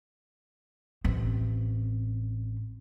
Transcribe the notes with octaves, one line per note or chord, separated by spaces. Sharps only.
A1 C4